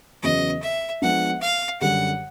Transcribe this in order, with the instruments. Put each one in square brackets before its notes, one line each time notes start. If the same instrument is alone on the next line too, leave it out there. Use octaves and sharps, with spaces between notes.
[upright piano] E2 C#3 F#3 B3 [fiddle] D#5
[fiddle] E5
[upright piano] F3 G#3 B3 D4 [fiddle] F#5
[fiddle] F5
[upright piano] F#2 D3 G3 [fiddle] F#5